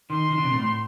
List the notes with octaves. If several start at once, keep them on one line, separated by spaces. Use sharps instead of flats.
D#3 C6
D#3
D3
C3
A#2
A2